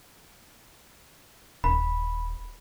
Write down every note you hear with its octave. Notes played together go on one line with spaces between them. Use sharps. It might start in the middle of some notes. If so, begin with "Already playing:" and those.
D#1 B5